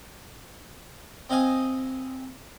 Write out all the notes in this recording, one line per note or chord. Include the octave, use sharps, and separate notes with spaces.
C4 D#5 F5 G#5 D#6